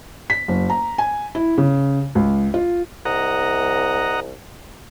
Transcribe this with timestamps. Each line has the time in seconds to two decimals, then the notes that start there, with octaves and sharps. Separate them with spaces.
0.30 B6
0.48 F#1
0.70 A#5
0.98 G#5
1.35 E4
1.58 C#3
2.15 C#2
2.54 F4
3.05 C2 D#5 F#5 A#5